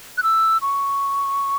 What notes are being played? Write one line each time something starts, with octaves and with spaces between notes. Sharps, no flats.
F#6
E6
C#6